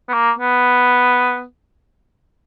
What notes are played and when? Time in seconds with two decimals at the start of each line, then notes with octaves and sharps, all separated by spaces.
0.08 B3
0.13 A#3
0.38 B3